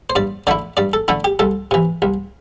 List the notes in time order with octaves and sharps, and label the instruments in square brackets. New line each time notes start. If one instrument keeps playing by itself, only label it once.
[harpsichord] C5
G2 D5
D3 A3 E4 D5
G2 D5
A4
D3 A3 E4
G4
C2 A4
C3 E3
C2